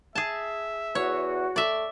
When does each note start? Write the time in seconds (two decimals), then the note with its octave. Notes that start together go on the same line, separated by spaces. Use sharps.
0.15 G#4 E5 A5
0.95 E2 F#4 C#5
1.56 A3 D5 E5